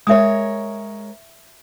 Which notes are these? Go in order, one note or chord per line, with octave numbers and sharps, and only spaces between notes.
G#3 A#4 C#5 E5 D#6